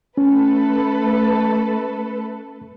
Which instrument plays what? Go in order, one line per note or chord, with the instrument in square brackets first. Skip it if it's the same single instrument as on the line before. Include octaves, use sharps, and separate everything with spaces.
[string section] A3 A4 B4 [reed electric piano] C#4